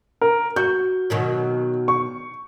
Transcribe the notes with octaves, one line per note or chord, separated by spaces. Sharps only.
A#4
F#4 G6
B2 D#3 F#3
C#6